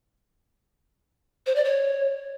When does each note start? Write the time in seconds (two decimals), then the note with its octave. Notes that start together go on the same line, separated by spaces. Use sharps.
1.46 C5
1.56 D5
1.65 C#5